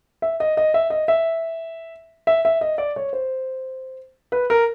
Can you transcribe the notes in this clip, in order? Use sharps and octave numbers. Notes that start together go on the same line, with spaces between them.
E5
D#5
D#5
E5
D#5
E5
E5
E5
D#5
D5
C#5
C5
B4
A#4